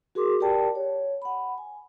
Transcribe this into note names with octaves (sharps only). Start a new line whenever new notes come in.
F#4 G#4 A#4 C6 D6
G4 A#4 D5 G5 A5
C#5
F#5 B5
G#5